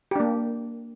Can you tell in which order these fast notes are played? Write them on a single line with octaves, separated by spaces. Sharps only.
G4 D4 A#3